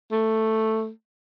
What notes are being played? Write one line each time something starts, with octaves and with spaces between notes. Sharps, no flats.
A3